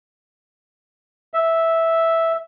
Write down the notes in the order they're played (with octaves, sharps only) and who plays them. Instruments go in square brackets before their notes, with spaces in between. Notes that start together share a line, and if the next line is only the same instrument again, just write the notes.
[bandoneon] E5